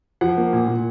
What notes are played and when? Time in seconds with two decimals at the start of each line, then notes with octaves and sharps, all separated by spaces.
0.21 F3 F#5
0.37 A#3
0.53 A#2
0.68 A#2